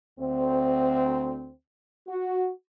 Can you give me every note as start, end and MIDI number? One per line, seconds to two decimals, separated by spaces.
0.20 1.51 38
0.20 1.51 60
2.07 2.50 66